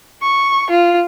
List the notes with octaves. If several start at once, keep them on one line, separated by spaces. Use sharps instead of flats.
C#6
F4